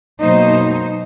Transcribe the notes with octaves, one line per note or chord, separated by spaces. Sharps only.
B2 F#3 A#3 D#4 C5